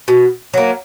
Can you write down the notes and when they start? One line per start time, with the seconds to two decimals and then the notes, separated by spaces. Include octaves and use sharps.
0.08 B2
0.54 F#3 A#3